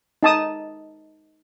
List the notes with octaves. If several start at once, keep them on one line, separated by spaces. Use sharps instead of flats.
D#4 A5 D#6